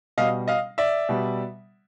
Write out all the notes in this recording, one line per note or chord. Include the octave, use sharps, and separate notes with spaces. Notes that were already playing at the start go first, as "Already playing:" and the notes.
B2 G3 D#5 F5
D#5 F5
D5 E5
B2 G3